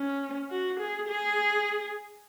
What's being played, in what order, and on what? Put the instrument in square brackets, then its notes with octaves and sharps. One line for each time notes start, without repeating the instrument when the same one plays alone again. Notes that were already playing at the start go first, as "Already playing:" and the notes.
Already playing: [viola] C#4
F#4
G#4
G#4